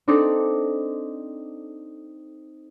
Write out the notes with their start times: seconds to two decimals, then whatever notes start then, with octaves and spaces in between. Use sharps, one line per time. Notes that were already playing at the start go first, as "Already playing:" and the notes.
0.08 C4 D4 D#4 A4 D5